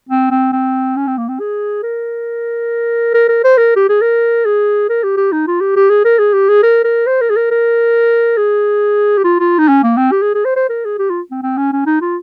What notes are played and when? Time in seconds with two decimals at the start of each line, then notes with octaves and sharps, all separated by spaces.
0.09 C4
0.31 C4
0.53 C4
0.96 C#4
1.07 C4
1.18 A#3
1.28 C4
1.40 G#4
1.83 A#4
3.14 A#4
3.29 A#4
3.44 C5
3.57 A#4
3.76 G4
3.89 G#4
4.02 A#4
4.45 G#4
4.89 A#4
5.03 G4
5.17 G4
5.32 D#4
5.47 F4
5.61 G4
5.76 G4
5.90 G#4
6.05 A#4
6.19 G#4
6.33 G4
6.49 G#4
6.63 A#4
6.84 A#4
7.07 C5
7.21 A#4
7.30 G#4
7.36 A#4
7.51 A#4
8.37 G#4
9.18 G4
9.24 F4
9.40 F4
9.59 D#4
9.68 C#4
9.83 A#3
9.97 C4
10.12 G4
10.22 G#4
10.34 G#4
10.45 C5
10.56 C5
10.70 A#4
10.85 G#4
10.99 G4
11.10 F4
11.31 C4
11.43 C4
11.57 C#4
11.72 C#4
11.86 D#4
12.01 F4